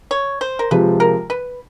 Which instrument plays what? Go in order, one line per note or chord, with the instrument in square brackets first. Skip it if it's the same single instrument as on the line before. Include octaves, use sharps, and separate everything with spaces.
[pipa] C#5
C5
A#4
[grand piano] C3 F3 G#3 [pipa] B4
[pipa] A#4
B4